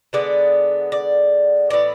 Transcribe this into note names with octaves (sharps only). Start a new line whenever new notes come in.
D3 G#3 B3 D5
D5
A2 E3 B3 D5